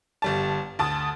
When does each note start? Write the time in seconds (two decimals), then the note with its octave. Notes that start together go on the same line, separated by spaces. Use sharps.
0.22 G1 G3 A5
0.79 D2 A5 D#6